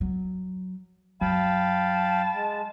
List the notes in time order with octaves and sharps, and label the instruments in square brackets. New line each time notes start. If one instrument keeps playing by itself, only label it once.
[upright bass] F#3
[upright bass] F#2 [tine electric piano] F#3 [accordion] F5 G5 B5 [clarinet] A5
[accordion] G#3